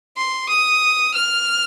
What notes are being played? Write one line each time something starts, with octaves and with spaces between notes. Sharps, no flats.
C6
D#6
F6